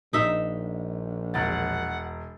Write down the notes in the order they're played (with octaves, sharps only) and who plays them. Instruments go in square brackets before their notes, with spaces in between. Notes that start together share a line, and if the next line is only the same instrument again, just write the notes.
[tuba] A#1 [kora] D#4 E5
[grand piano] E1 A6 [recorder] F#5